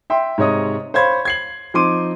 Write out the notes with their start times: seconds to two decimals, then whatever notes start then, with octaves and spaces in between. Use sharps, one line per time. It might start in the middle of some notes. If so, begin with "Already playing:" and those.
0.10 E5 G5 C6
0.38 G#2 C3 C#5 D#5 D#6
0.94 C5 C#5 F5 B5 C6 G#6
1.25 G#6 C7 F#7
1.74 F3 C4 D#4 C6 D6 D#7